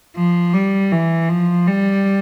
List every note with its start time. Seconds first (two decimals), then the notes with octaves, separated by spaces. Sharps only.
0.16 F3
0.54 G3
0.92 E3
1.29 F3
1.67 G3